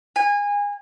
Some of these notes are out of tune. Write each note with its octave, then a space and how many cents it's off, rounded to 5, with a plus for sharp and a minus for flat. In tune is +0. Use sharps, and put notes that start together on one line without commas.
G#5 -25